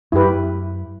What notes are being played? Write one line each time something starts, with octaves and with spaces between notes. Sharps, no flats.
F#2 E4 G4 B4